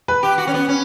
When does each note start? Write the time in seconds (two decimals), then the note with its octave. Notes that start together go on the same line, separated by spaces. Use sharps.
0.08 B4
0.23 G4
0.38 F#4
0.47 C#4
0.54 B3
0.69 C#4